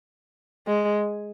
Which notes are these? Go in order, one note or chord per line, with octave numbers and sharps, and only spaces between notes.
G#3